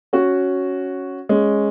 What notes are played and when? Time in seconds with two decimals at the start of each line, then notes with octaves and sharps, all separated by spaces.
0.13 C#4 F#4
1.29 G#3 C#4